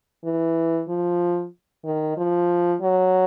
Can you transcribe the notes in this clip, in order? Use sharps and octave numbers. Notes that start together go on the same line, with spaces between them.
E3
F3
D#3
F3
F#3